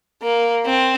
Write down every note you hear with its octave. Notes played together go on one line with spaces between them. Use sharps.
A#3
C4